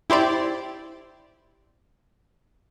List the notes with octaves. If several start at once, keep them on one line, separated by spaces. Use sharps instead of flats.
E4 G4 C5 D5